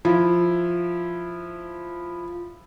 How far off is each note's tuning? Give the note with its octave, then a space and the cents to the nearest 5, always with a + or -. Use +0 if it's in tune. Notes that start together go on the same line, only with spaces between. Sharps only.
F3 +0 E4 +0